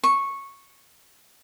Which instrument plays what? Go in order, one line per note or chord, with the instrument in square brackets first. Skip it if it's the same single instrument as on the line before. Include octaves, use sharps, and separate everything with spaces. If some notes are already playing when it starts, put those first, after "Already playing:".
[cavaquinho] C#6